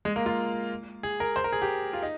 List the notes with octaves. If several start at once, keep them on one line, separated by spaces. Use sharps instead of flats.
G#3
A#3
F4
G#4
A#4
C5
A#4
G#4
G4
F4
D#4